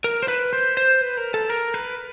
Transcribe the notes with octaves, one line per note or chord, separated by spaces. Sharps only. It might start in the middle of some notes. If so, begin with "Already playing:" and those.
A#4
C5
B4
C5
C5
B4
A#4
A4
A#4
B4